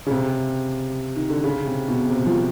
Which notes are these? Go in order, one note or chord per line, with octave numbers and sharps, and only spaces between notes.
C#3
C3
D#3
D3
C#3
C3
B2
C3
F3